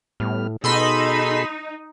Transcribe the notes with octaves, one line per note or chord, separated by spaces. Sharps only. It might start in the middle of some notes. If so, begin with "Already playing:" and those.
A2 G3 B3 F6
B2 D#4 G#4 A4 B5 C6 E6